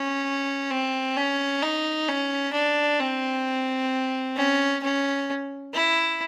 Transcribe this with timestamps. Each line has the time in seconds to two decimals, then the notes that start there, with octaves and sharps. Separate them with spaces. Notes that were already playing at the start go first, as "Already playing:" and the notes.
Already playing: C#4
0.71 C4
1.17 C#4
1.63 D#4
2.08 C#4
2.53 D4
3.00 C4
4.37 C#4
4.83 C#4
5.74 E4